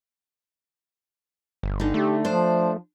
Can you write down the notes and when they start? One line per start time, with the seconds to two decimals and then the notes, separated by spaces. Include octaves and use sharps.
1.63 G1
1.80 D3 D#4
1.94 A3 G4
2.25 F3 D4 C5